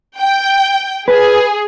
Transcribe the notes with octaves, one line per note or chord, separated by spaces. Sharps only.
G5
G#4 B4